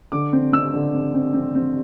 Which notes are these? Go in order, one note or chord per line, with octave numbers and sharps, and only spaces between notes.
D3 D6
C4
C4 E6
D3
C4
C4
C4
C4